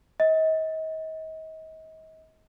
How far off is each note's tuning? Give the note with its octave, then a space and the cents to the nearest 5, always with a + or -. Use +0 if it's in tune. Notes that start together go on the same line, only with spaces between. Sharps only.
D#5 +35